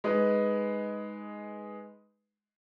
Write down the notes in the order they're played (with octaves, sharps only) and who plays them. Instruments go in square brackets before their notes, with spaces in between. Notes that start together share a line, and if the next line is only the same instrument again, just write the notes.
[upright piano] G#3 D#4 B4